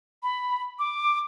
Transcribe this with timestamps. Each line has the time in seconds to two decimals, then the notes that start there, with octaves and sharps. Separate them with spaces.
0.23 B5
0.79 D6